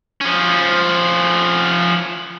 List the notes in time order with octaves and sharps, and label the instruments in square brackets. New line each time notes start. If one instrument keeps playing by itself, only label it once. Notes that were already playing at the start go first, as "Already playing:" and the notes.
[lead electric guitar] F3 C#4